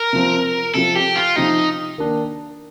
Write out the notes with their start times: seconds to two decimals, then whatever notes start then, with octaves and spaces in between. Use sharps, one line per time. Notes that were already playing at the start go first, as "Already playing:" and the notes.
Already playing: A#4
0.13 C3 F3 C4
0.74 C3 F3 C4 A4
0.95 G4
1.16 F4
1.36 C3 F3 C4 D#4
1.98 D#3 A#3 D4